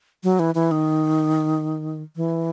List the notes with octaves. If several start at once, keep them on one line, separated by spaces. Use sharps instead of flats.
F#3
E3
E3
D#3
E3